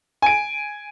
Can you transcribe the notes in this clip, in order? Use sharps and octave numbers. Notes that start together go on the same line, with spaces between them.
G#5 D7